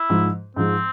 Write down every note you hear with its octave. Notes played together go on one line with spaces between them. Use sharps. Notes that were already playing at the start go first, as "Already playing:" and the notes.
Already playing: E4
G#2 F3 G#3
G#2 F3 G#3 C4